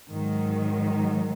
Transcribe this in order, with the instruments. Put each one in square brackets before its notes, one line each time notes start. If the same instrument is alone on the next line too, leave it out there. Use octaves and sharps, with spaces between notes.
[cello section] G#2 D#3 F#3